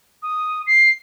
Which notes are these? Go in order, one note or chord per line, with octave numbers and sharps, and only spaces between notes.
D#6
C7